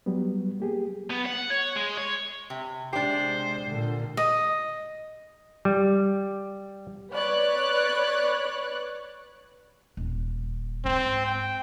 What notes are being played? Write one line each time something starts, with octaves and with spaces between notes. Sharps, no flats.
F#3 G3 B3
A#3 G4 G#4
B3
F#5
C#5
G#3
C#5
C3
C3 G#3 D4 G4 C5
A#2 D3
D#5
G3
B4 C#5 D5 F#6
D#1
G#2 C4
G5